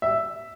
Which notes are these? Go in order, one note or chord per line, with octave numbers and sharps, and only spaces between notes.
E5